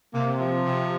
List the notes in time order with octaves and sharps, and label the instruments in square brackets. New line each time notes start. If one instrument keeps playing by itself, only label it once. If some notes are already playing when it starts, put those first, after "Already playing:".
[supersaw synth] C3 [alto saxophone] A#3
[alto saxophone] F3
[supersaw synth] C3